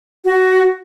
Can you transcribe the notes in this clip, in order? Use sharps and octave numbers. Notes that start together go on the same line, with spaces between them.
F#4